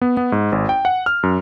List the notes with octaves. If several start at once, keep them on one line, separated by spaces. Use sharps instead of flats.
B3
B3
G#2
G#1
G5
F#5
F6
F#2